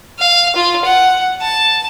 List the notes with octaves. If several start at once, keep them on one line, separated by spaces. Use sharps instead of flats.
F5
F4
F#5
A5